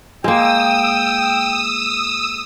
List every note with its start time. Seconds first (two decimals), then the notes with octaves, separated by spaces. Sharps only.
0.24 G#3 A#3 G5 D#6 E6